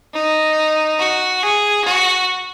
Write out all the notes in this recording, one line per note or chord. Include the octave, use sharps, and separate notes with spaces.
D#4
F#4
G#4
F#4